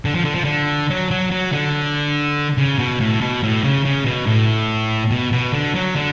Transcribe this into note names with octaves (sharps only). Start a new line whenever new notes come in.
D3
F3
D3
F3
D3
F#3
F#3
F#3
D3
C#3
B2
A2
B2
A2
C#3
C#3
B2
A2
B2
B2
D3
F#3
D3